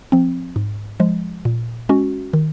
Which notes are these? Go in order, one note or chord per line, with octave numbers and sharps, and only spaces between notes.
F3 C4
G#2
F3 G#3
A#2
G#3 C#4 F#4
D#3